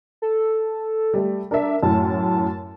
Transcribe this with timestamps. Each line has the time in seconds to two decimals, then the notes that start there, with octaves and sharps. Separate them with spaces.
0.22 A4
1.14 G3 A3
1.51 D4 A#4 E5
1.83 F#2 A2 A5